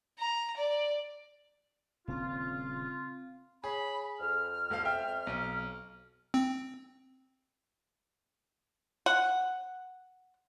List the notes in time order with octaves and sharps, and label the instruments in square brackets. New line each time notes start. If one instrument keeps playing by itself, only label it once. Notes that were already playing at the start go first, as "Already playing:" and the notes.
[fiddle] A#5
D5
[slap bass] D#1 C#3 C#4 [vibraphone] C4 F5 [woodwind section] F4
[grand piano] G#4 [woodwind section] C#5 B5
[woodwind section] F2 F6
[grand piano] E1 A4 F5
E5 G5
B1
[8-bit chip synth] C4
[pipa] F#5